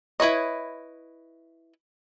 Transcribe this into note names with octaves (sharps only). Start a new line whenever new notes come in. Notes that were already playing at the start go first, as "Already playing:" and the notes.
E4 B4 C#5 D#5